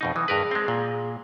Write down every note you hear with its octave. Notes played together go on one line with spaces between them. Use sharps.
F2 B2 D#4
E3 D#6
G2 G#4 A#4 B4
G#3 C4
A#2